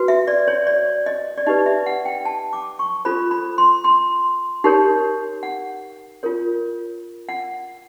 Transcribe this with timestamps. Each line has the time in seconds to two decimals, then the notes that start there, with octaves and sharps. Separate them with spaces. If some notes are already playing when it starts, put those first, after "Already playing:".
Already playing: F#4 B4
0.08 E5
0.28 D5
0.48 C#5
0.67 D5
1.06 D#5
1.38 D5
1.46 D#4 G4 B4 D#5
1.66 E5
1.86 F#5
2.05 G5
2.25 A5
2.53 D6
2.79 C#6
3.05 F4 A4 C5 B5
3.31 B5
3.58 C6
3.84 C6
4.64 D#4 G4 A#4 C#5
5.43 F#5
6.23 F4 A#4 C#5
7.29 F#5